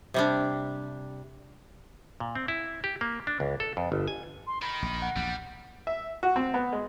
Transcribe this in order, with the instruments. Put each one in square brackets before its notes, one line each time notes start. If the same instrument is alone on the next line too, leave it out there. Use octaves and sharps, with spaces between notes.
[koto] C3 G3 D4
[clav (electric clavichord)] A#2
C4
E4
G4
A#3
D4
C#2
A4
F2
G1
G#5
[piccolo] C6
[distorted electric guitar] D#3 D#4 [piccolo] B5
[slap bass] A#1
[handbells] F#5
[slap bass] A#1 E2 [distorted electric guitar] G3
[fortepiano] E5
F#4
C4
B3
G#3